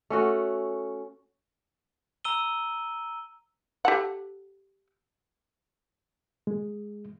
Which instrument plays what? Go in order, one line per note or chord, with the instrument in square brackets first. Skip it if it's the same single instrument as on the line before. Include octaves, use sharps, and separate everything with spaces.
[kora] A3 C#4 F#4
[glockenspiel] A#5 E6 D#7 G7
[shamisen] G4 A4 F#5
[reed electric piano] G#3